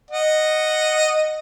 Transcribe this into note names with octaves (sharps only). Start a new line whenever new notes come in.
D#5 F#5